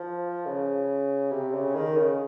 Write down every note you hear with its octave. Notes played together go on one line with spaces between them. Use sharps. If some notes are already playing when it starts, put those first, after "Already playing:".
Already playing: F3
C#3
C3
C#3
D#3
C#3